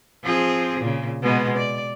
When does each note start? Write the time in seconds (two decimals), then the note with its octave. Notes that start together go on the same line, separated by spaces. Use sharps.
0.23 F3 C4 G#4
0.80 A#2 C#3
1.22 B2 G#3 B3
1.57 D5